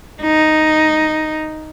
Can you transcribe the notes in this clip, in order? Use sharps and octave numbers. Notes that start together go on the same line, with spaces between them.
D#4